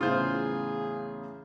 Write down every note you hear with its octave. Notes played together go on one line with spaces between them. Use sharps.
E2 A2 C#3 F4 G#4 C5